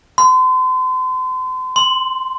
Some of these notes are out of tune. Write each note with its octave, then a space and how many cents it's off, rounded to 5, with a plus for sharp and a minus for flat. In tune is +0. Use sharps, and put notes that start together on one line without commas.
C6 -40
C6 -5